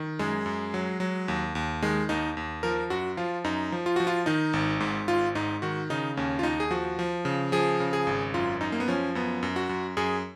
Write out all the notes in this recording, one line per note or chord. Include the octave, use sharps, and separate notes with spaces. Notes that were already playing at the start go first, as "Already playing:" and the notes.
Already playing: D#3
F#2 G#3
F#2
F#3
F#3
D#2
D#2
D#3 G#3
D#2 D#4
D#2
F3 A#4
F#2 F#4
F3 F4
F#2 D#4
F3
F4
F3 F#4
F4
D#3 D#4
G#1
G#2
G#1 F4
G#2 D#4
D#3 F#4
C#3 D#4
D#2 C#4
F4
D#2 D#4
G#4
F3 F#4
F3
C#3
F3 G#4
C#3
G#4
G#1
F#2 F4
F#2 D#4
A#3
B3
F3 C#4
F#2 B3
F#2
F#4
F#2
F#2 G#4